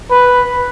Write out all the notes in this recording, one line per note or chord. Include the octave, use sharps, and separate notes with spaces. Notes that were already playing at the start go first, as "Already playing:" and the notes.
B4